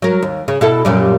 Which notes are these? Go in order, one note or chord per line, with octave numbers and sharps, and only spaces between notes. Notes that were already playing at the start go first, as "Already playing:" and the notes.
F#3 A#4
D#2
C#3
B2 E4 A4
F#2 A#2 G3